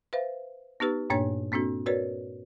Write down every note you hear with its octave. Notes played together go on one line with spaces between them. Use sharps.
B4 C5 E5 F5
B3 D#4 G4 B4 E6
G2 A#2 A#3 D4 C#5 G#6
A#3 C4 D4 F#4 A4
F#4 A#4 B4 C#5 D5